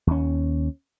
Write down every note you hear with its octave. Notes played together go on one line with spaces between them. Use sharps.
D#2 C#4